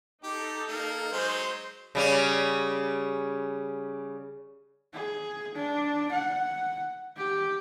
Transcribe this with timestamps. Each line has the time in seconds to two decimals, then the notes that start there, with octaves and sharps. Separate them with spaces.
0.24 D#4 G4 A4
0.68 A#3
1.13 F#3 G#3 C5
1.95 C#3 G3 C#4
4.93 G#4
5.54 D4
6.11 F#5
7.16 G4